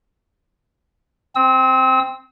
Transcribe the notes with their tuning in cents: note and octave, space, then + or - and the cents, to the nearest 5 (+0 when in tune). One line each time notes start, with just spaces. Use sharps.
C4 +0 E6 -40